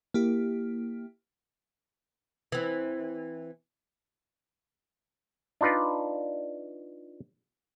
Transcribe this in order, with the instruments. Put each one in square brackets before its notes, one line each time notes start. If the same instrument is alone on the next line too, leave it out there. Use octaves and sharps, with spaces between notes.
[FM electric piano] A#3 E4 G4
[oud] E3 C4
[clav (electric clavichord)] D4 D#4 F4 B4 D5